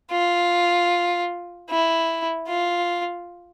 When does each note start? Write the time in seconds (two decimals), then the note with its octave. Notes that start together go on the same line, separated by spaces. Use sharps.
0.11 F4
1.69 E4
2.48 F4